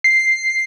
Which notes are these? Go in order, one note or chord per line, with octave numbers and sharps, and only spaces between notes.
C7